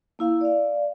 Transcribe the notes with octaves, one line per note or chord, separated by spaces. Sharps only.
A#3 E4 F5
D5 F5